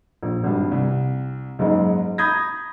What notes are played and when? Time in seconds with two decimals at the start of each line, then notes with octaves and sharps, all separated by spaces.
0.23 A#1
0.44 G#1 G2
0.71 C2
1.59 F#1 G#2 G#3 D#4
2.18 A#5 B5 D#6 G6 G#6 A#6